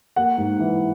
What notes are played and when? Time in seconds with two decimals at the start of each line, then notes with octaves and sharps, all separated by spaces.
0.16 A#3 F#5
0.38 G#2
0.59 E3